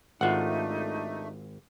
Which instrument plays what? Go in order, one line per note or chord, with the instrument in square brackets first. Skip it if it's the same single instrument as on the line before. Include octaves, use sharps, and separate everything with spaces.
[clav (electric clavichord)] G#1 [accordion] A3 [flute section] D4 D#4 G4 [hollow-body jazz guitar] F4 F#5